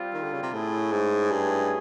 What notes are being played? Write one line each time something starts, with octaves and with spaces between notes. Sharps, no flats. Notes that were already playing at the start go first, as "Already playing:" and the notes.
Already playing: G3 C4 F4
D#3
D3
C#3
C3
A2 A3 C#4 E4 G#4
G#2
G2